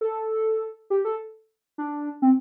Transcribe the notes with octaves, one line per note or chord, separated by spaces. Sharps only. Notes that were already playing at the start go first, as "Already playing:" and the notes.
A4
G4
A4
D4
C4